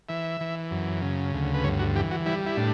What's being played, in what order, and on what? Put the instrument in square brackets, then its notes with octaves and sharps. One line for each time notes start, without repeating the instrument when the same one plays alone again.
[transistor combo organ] E3 E5
E3
F#2
C#3
D2
B4
G2 C#5
F#4
E3 G4
F#4
G3 E4
E4
A2 D4